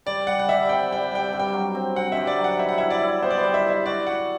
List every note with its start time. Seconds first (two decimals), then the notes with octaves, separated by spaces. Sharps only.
0.06 G3 D5
0.27 G3 F#5
0.39 F#5
0.48 G3 E5
0.69 C4 G5
0.91 G3 G5
1.11 G3 G5
1.33 G2
1.40 G5
1.54 F#3
1.75 C4
1.96 C4 F#5
2.12 G2 E5
2.27 D5
2.38 F#3
2.44 F#5
2.59 E4 E5
2.69 F#5
2.78 E4 E5
2.90 D5
3.01 E4
3.23 B3 C5
3.31 D5
3.38 C5
3.44 G3
3.54 E5
3.65 E4 E5
3.86 F#4 D5
4.07 F#4 F#5